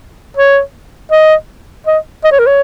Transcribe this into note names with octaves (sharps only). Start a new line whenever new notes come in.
C#5
D#5
D#5
D#5
C#5
A#4
C#5